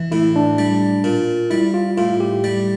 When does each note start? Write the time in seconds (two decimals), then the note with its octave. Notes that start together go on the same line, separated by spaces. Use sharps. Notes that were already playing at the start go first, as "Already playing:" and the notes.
Already playing: E3
0.12 A2 E4
0.36 D4
0.58 G3
1.04 A#2
1.50 G3 E4
1.74 F4
1.97 A2 F4
2.20 G4
2.44 G3